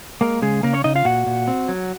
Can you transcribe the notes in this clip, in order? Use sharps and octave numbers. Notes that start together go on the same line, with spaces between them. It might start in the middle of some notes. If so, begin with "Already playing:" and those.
G#3 A#3 A#4
C#3 G#3 G#4
C#3 A#3 A#4
C#4 C#5
C#3 D#4 D#5
F4 F5
A#2 F#4 F#5
A#2
C4
F#3